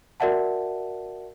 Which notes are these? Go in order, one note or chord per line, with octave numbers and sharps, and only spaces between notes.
F#4 A#4 D5 E5 F#5 A5